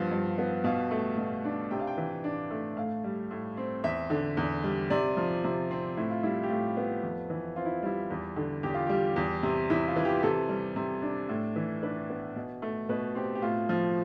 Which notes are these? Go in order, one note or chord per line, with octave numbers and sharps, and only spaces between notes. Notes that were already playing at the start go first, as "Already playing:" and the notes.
Already playing: G2 F3 B3 F5
G2
B3
B2 F5
A3
B2
D4
C3 G5
F5
G5
E3
D4
A3
A2 F5
G3
A2
C4
E2 E5
D3
E2
G3
C3 D5
F3
C3
C4
A2 E4
F4
G3 E4
G4
A2 F4
B3
F2
E3
C4 F4
E4
G3 E4
E2
D3
E2 G4
F4
G3 G4
E2
C3
E2 E4
F4
E3
G4
C3 A4
G3
C3
D4
A2
E3
D4 B4
B3
B2
A3
B2 B4
C4 G4
G4
A2 F4
F3